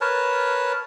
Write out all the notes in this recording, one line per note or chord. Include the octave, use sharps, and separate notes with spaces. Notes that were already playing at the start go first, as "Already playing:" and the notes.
A#4 B4 C#5 A5